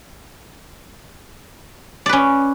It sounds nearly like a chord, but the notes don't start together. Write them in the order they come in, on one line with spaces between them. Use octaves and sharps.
D5 B4 C#4